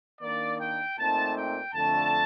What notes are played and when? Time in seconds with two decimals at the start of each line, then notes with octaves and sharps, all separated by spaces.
0.21 D#3 A#3 D4 D5
0.59 G5
0.98 A#2 A3 C4 D#4 A5
1.36 G5
1.73 F2 D3 A3 A5